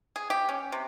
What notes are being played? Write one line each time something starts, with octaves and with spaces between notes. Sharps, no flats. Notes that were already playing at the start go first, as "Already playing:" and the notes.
G#4
G4
C#4
C3